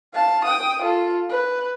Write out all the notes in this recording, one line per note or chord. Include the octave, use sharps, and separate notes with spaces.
F5 A5
G5 D#6
F4 A4
B4